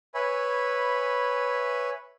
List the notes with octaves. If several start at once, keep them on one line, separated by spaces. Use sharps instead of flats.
B4 C#5 E5 G#5 B5